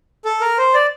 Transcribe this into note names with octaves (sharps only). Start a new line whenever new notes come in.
A4
A#4
C5
D5